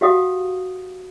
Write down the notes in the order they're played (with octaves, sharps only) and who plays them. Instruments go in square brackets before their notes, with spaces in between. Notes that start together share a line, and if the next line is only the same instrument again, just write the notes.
[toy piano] F#4 G4 F5 F#5 D#6